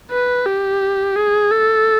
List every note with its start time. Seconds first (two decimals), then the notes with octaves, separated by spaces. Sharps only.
0.11 B4
0.46 G4
1.16 G#4
1.51 A4